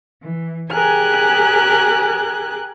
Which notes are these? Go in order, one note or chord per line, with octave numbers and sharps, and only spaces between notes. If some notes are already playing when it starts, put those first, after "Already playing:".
E3
G4 G#4 A#4 G#5 F#6